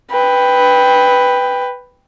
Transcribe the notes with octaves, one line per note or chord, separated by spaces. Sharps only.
B4 G5